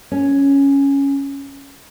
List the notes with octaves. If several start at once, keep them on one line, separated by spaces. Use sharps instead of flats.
C#4